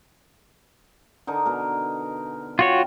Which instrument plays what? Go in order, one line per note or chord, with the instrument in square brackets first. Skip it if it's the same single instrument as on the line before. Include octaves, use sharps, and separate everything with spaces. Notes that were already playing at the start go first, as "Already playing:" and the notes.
[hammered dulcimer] D3 D#4 A#4
B2 A#4
[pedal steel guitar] F4 F#4 C#5 [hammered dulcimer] G5